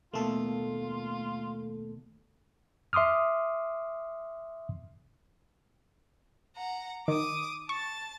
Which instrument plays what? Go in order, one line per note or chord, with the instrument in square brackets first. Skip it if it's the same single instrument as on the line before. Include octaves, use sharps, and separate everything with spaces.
[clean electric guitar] D#2 B2 C6 [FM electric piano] A3 A#3 A4 [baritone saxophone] F4
[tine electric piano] E5 C6 D6 D#6 F6
[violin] F#5 A#5
[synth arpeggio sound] D#3 [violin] D6 D#6
[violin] A5 A6 [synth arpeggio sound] C#6